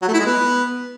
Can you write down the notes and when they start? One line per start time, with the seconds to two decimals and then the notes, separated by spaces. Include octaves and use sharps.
0.02 F#3
0.08 A3
0.14 E4
0.20 G#3
0.26 B3